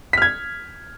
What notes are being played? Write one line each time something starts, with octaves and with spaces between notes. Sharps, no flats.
F6 G#6 B6